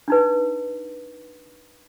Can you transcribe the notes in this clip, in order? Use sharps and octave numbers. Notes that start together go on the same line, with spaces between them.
D4 D#4 B4